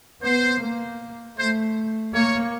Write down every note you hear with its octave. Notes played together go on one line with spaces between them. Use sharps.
B3 C5
A#3
A3 C5
A#3 C#5